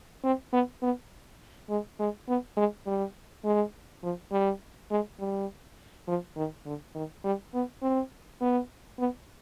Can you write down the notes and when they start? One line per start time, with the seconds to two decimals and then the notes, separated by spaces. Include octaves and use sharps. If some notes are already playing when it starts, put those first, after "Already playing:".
0.24 C4
0.53 B3
0.82 B3
1.70 G#3
1.99 G#3
2.28 B3
2.57 G#3
2.86 G3
3.45 G#3
4.03 F3
4.32 G3
4.90 G#3
5.19 G3
6.08 F3
6.36 D#3
6.66 D3
6.95 D#3
7.24 G3
7.54 B3
7.82 C4
8.41 B3
8.99 B3